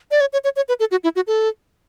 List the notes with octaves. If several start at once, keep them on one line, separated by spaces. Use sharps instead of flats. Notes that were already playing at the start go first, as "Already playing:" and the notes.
D5
C#5
C#5
C#5
C#5
B4
A4
F#4
E4
F#4
A4